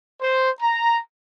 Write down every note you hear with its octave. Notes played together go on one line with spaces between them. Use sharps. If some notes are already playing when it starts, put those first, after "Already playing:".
C5
A#5